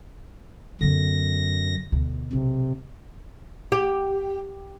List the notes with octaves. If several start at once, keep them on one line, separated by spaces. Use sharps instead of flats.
F#2 D3 B3 A#6
D2 B2
B1 C3
G4